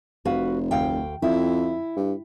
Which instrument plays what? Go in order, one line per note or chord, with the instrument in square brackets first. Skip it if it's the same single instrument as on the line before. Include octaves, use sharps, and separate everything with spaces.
[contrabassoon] F1 [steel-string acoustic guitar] F#4 B4 F5
[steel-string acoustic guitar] D2 F5 G5
[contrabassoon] F2 [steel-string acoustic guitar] E4
[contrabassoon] G2